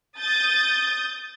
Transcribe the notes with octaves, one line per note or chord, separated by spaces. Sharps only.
D#6 G6 A6